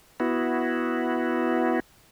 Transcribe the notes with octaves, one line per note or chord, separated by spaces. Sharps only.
B3 E4 F#4